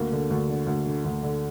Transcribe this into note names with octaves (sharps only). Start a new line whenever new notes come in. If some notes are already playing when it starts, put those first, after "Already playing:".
Already playing: D2 A#3
D3
D2
D3
D2
D3
D2
D3